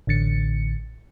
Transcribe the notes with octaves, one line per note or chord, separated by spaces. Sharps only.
A1 D3 A6 C#7